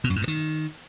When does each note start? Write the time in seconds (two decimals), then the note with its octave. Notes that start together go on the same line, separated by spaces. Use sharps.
0.04 B2
0.10 F#2
0.16 G#2
0.22 G2
0.28 D#3